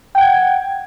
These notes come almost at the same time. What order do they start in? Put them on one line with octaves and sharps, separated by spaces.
G5 F#5 G#6